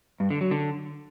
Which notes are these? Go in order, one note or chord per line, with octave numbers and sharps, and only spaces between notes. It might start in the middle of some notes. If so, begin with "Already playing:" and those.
G2
D3
F#3
D3